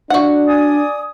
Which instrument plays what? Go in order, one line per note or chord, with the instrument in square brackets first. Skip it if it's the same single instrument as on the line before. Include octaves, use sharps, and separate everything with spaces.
[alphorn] D4 [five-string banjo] F#4 F#5
[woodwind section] D5 G#5 D#6